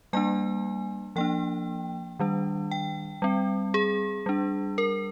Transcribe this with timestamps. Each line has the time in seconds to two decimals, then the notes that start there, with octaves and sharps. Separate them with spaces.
0.13 G3 A#3 D4 G#5
1.16 F3 A#3 D4 G5
2.19 D#3 G3 D4
2.71 G5
3.22 G3 C4
3.74 G#4
4.26 G3 D4
4.78 A#4